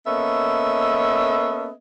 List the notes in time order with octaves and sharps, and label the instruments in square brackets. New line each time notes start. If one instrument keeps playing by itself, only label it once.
[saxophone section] A#3 B3 C#4 A4 D#5 E5